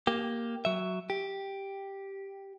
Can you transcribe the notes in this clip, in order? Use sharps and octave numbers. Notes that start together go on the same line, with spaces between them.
A#3 G4
F#3 E5
G4